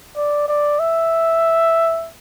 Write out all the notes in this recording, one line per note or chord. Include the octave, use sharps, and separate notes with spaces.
D5
D5
E5